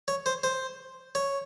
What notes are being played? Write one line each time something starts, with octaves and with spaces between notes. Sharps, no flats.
C#5
C5
C5
C#5